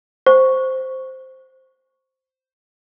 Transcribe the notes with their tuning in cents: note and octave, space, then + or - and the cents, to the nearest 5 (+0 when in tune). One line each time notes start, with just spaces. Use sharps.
C5 +0 C#6 +0